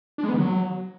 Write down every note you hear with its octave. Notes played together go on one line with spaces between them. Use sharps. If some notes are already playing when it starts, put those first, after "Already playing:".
D4
G#3
B3
D#3
F#3